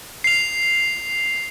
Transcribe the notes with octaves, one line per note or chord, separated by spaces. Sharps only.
C7 F7